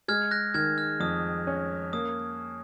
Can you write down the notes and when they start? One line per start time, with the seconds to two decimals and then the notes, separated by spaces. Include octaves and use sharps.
0.08 G#3 F6 G#6
0.31 F#6 A#6
0.54 D#3 F6 G#6
0.78 F6
1.00 F2 D#6
1.47 C#4
1.93 A#3 D#6